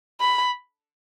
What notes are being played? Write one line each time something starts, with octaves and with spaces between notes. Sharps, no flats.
B5